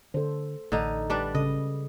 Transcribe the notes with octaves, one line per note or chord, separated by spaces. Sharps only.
D3 A4 C5
A1 D3 D#4
G3 D4 B4
C#3 A4 D#5